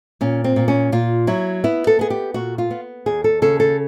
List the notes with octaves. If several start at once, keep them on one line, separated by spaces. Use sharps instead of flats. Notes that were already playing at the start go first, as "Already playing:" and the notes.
A#2 C#4
C4
A#2
C#4
A#2 F4
F#3 E4
B3 E4
A4
B3 G#4
G4
A#2 F#4
F4
B3
D#2 G#4
A4
C#3 A4
A4